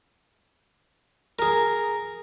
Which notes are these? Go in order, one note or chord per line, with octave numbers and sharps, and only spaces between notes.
G#4 A#4